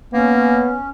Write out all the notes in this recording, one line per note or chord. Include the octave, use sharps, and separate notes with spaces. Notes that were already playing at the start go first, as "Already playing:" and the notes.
A#3 B3 C#4